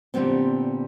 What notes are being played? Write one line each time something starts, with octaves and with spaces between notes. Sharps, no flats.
A#2 D3 G3 B3 C4